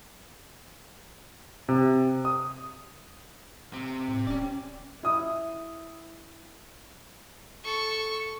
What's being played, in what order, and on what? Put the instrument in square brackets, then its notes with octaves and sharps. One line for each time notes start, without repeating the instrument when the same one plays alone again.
[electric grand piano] C3
D#6
[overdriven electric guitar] C3
[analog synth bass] A2
[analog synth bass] D#1 [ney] C#4 [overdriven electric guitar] G4 D5
[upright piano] E4 D#6
[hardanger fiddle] A4 C#6